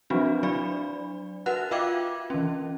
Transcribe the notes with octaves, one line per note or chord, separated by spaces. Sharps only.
F3 F#3 C4 D4 F#4
F#3 D4 D5 B5
F#4 A#4 B4 F#5 F#6
F4 E5 F5 G5 D6 G#6
E3 C#4